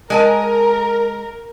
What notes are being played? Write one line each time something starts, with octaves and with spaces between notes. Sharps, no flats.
G#3 A#4 G#5 A5